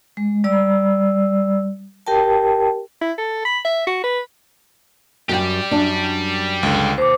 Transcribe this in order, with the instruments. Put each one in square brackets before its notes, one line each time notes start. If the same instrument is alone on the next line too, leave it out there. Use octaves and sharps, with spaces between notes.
[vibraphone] G#3
G3 D5 E6
G4 A#4 G5 A5
[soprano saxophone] E4
A4
B5
E5
F#4
B4
[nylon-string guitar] F#2 G5 [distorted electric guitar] G4 D5
[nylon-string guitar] F#2 D4
[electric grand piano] C#2 D3
[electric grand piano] D#2 [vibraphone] C5 D6